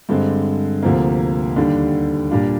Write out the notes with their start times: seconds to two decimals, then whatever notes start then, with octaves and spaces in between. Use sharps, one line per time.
0.09 G2 D3 G#3 C4
0.83 D2 C3 F3 A#3
1.56 D#2 D3 G3 D4
2.31 A#2 G3 D4 F4